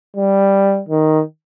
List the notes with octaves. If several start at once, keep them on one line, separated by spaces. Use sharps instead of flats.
G3
D#3